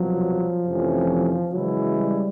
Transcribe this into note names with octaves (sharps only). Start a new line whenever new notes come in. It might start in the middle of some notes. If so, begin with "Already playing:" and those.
Already playing: C2 B2 F3 F#3
F2 C3 E3 A3 C#4
C#3 E3 F#3 G#3 C#4 E4
G3